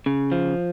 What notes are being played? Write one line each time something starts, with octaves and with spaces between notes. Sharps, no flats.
C#3
F3